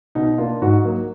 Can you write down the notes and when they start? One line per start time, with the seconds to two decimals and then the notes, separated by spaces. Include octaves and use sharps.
0.15 B2 D#4
0.38 A#3 D4 F4
0.62 G#2 D#4 F#4
0.84 F#3 A#3